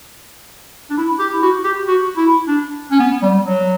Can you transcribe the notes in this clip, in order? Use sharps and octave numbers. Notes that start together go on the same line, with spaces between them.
D4
E4
G4
E4
F#4
G4
F#4
E4
D4
C#4
B3
G3
F#3